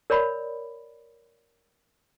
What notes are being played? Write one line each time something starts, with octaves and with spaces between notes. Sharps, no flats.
A#4 C#5 D5 B5